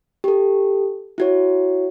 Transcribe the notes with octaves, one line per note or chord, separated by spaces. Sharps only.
G4 A4
E4 F#4 C#5